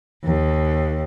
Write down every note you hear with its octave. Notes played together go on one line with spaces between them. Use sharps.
D#2